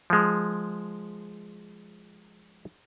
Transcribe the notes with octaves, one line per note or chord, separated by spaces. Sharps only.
F3 G#3